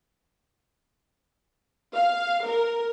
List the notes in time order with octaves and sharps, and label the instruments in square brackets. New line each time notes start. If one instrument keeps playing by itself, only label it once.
[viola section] F5
A#4